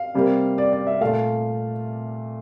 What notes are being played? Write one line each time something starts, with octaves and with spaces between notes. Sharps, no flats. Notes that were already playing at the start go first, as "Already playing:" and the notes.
Already playing: F5
C3 G3 A#3
D5
D5
E5
A#2 A3 F5